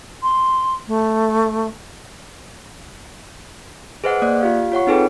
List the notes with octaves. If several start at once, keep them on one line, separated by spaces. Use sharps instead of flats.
C6
A3
G#4 B4 C5 D#5 F#5
A#3 D5 F#6
F4 G4 F5
F4 C#5 F#5 C#6
C4 D#4 G#4 A4 B4 G5